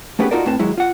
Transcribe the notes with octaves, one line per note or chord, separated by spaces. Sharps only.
A3 B3 C#4 G4 G#4 B4
D#4 F4 F#4 A4 A#4 D5
A2 C4 B4 A5
D#2 F#3 G#3 E4
F4 F#5